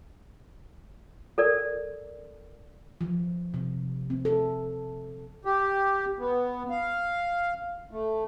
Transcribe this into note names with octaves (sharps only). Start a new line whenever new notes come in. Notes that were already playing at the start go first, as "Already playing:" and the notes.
A4 A#4 D5
F3
C3
C4
A4
G4
B3
F5
A3